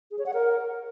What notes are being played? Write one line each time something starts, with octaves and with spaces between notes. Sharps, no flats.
G#4
C#5
F#5
A#4